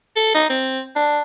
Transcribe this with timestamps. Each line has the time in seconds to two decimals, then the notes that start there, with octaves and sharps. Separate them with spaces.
0.16 A4
0.34 D#4
0.50 C4
0.96 D4